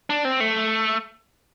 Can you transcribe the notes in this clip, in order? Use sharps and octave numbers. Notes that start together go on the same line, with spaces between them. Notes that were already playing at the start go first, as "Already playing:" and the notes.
D4
C4
A3